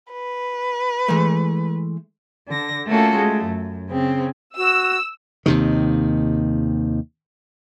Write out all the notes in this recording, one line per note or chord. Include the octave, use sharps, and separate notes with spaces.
B4
E3 G#3 A3
D3 A#6
A3 A#3 C#4 F4 F#4 A4
G#3 A3
F#2
C#3 C4
F#4 E6
D#2 C3 D#3